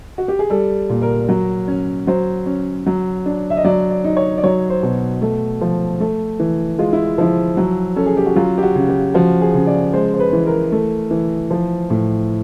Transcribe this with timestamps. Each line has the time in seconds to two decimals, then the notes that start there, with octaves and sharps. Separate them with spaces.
0.18 F#4
0.28 G4
0.39 G#4
0.50 G3 A4
0.90 A#2
1.02 A#4
1.29 F#3
1.68 C#4
2.07 F#3 C5
2.46 C#4
2.86 F#3
3.26 D4
3.50 E5
3.57 D#5
3.64 F#3 D5
3.91 D5
4.04 D#4
4.17 C#5
4.38 D5
4.43 F#3 C#5
4.70 C5
4.83 B2
5.22 A3
5.61 F3
6.00 A3
6.39 E3
6.78 G#3 F4
6.93 E4
7.18 F3 E4
7.57 F#3
7.96 C#4 A4
8.06 G#4
8.17 G4
8.26 F#4
8.36 F#3 F4
8.58 G4
8.63 F#4
8.75 C#3
8.89 G4
9.14 F3 F#4
9.41 G#4
9.54 C#3
9.67 D5
9.93 G#3 C5
10.14 C5
10.20 B4
10.33 E3
10.46 A#4
10.72 A3
11.11 E3
11.51 F3
11.90 A2